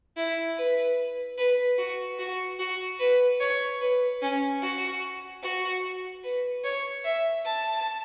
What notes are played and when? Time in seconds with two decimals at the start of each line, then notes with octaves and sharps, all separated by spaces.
0.17 E4
0.57 B4
1.38 B4
1.78 F#4
2.19 F#4
2.59 F#4
3.00 B4
3.40 C#5
3.81 B4
4.22 C#4
4.62 F#4
5.43 F#4
6.24 B4
6.64 C#5
7.05 E5
7.45 A5